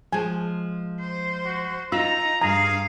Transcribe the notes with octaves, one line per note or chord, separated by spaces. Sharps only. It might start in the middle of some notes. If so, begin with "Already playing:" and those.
F3 G#3 G#5
C5
F#4
D#4 F4 A#5 E6
G2 G#4 F5 A#5